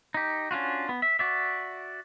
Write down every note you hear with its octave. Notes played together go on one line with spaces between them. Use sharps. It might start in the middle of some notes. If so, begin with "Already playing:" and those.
D#4 G4
C#4 D4 F4 F#4
B3
E5
F#4 D5 E5